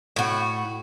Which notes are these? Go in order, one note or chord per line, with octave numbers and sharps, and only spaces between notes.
A2 F#4